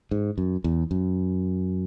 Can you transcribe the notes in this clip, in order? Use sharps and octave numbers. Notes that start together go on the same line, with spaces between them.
G#2
F#2
E2
F#2